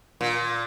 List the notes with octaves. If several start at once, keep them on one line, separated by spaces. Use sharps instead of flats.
A#2